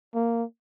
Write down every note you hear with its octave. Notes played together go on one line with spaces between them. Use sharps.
A#3